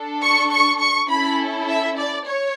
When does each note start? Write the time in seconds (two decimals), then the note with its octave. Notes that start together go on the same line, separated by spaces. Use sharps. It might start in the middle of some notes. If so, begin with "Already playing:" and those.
Already playing: D4 A4
0.22 C#6
0.51 C#6
0.80 C#6
1.10 C#4 E4 A4 B5
1.68 E5
1.97 D5
2.26 C#5